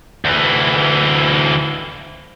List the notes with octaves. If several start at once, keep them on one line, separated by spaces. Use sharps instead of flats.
D2 E3